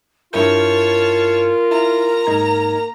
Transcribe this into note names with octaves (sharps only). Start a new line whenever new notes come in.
G2 E4 F4 A#4 C#5 A5 G6
E4 A#5
G#2 A#3 D#4 G#6